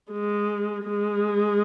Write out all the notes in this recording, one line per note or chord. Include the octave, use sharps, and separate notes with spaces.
G#3
G#3